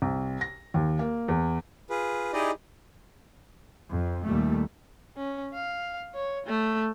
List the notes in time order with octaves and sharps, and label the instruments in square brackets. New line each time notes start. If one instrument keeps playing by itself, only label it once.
[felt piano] C2
A#6
D#2
A#3
E2
[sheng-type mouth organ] F4 G#4 B4
D#4 E4 G4 G#4 D5 D#5
[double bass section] F2
D#2 A#2 G3 A3
[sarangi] C#4
F5
C#5
A3